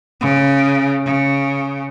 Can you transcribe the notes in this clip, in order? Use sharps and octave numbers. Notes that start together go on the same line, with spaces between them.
C#3
C#3